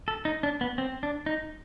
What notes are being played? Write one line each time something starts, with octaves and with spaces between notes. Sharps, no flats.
A4
D#4
D4
B3
C4
D4
D#4